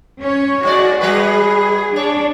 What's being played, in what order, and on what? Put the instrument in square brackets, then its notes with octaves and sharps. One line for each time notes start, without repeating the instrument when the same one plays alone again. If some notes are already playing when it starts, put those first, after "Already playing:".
[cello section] C#4 C#5
[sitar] G#2 G#3 D5 [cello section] F#4
[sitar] G3 F#4 B4 [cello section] G#4
[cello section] D4 [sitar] C#5